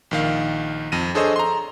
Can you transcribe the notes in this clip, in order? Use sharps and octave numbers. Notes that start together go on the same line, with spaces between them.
A#1 D#3 F5
F2 A#6 D#7
D4 G#4 A4 C5 C#5 D#5
A#5 C6